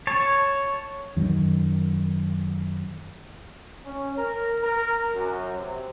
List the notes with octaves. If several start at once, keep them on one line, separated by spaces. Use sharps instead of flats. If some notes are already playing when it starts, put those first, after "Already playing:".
C#5 A5
F#2 D#3
C#4
A#4
A#4
F#2
C3